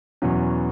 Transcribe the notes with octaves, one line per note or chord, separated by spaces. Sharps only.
E2 B2 F#3 C#4